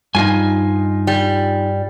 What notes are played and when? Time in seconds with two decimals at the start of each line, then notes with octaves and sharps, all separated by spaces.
0.15 G2 D#4 F4 G#5
1.07 G3